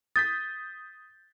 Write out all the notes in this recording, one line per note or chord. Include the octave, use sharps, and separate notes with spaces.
D#6 G6 A6 B6